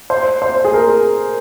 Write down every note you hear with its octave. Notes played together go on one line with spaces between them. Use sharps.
C5
C5
G#4
A#4